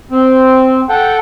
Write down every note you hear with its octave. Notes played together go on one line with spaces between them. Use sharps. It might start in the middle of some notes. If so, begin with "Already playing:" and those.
C4
A4 F#5 G5